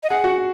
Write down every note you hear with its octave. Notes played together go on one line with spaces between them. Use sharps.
D#5
G#4 F#5
F#4